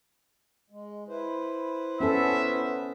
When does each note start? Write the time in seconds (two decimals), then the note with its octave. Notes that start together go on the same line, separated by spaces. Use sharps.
0.70 G#3
1.08 E4 B4 C5
2.00 B3 C#4 A4 E5